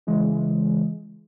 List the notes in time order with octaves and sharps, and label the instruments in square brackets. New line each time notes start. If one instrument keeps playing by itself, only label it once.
[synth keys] C#3 E3 G#3